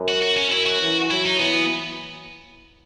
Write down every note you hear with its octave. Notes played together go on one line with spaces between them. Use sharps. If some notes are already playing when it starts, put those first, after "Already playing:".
Already playing: F#2
F#4
F#4
C#4
F#2 E4
F#4
E3
F#3 E4
D#4
E3 B3